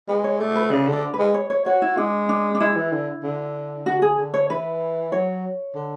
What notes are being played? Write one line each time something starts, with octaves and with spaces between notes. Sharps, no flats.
G#3 B4
C#5
A3 D5
B4
C#3 D5
D3 D5
B4
G#3
C#5
C#5
F#4 C#5
E4
G#3 D4
D4
D4
G#3 E4
E3
D3
D3
D3 F#4
G#4
D3
C#5
E3 B4
F#3 C#5
D3